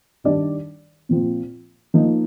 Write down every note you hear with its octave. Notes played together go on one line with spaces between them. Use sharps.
D#3 G3 D4 G4 D5
A#2 F3 C4 F4
F3 A#3 D#4